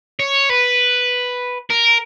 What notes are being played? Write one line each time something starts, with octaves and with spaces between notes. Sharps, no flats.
C#5
B4
A#4